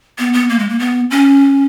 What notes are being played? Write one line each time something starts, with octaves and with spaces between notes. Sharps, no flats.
B3
B3
A#3
G#3
A#3
B3
C#4